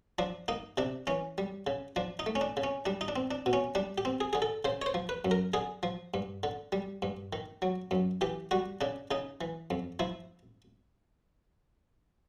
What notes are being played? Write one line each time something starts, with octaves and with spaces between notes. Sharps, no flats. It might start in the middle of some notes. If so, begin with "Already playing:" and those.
F3 D4
A#3 D#4
C3 D4
E3 C#4
G3
C#3
F3 D4
D#4
A3
C#4
D4
C#3
C#4
G3 D4
D#4
D4
C4
D4
B2
C#4
G3 D4
G4
C4
G#4
D3 G#4
A4
C#3 C5
C#5
C5
F3
B4
F#2
A#4
D3 G#4
F3
G2
D3
G3
G2
D#3
F#3
F#2
E3 G4
G3 F#4
C#3 D4
C#3 D#4
E3
F2
F3 E4